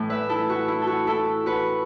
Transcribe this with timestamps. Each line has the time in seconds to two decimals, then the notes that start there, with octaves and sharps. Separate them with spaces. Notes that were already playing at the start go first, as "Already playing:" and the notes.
Already playing: A2 E3 A3
0.10 B4 E5
0.29 E4 A4
0.49 F#4
0.68 E4
0.82 A4
0.87 F#4
1.07 E4 A4
1.46 F#4 B4